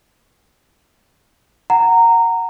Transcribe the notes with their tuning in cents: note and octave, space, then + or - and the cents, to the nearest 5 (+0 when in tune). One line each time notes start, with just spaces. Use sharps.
F#5 +0 A#5 -15